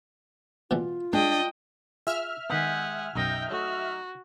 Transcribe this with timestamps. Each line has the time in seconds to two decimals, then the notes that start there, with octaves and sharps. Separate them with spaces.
0.71 B2 E3 G3 F4
1.13 G#3 D4 D#5 G5
2.07 F4 G#4 E5 G#5 F6
2.50 D#3 G#3 B3 G4 D#5 F#5 G#5
3.15 B1 F#2 F#3 D#4 D#5 G5
3.50 A3 F#4 A4 C#5